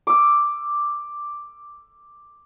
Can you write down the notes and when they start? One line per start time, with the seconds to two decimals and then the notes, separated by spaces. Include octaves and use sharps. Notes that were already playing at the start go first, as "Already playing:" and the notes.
0.07 D6 E6